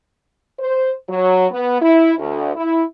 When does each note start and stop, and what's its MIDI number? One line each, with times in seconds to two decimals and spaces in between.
0.59 0.92 72
1.09 1.46 54
1.51 1.79 59
1.82 2.14 64
2.18 2.52 38
2.56 2.83 64